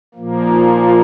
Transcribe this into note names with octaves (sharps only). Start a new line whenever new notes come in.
A#2 F3 A#3
D#4
F4